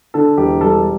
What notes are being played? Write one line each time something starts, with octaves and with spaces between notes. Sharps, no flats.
D3 A4
E1 G4
G3 A4